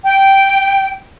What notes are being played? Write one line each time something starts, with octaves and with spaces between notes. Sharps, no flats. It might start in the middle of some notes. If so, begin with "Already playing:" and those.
G5